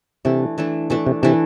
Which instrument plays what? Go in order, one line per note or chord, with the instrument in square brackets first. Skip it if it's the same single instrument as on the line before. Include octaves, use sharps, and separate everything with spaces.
[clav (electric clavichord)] C3 [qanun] E3 A3 D4
[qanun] E3 A3 D4
[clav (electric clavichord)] B2 [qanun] E3 A3 D4
[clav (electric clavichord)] C3
[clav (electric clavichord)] C3 [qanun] E3 A3 D4